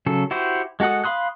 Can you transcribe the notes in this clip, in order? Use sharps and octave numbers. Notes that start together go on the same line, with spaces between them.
C#3 F#3 A4
E4 F#4 G4 C5
G#3 F#4 A4 F#5 D#6
F5 B5 C6 D#6 F#6